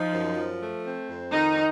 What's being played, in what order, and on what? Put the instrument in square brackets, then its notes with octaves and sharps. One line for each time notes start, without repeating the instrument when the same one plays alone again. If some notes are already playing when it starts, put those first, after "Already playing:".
Already playing: [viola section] F3 [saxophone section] D#4
[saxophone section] F#2
F3
A3
C4
F2
[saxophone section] D#3 [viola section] D#4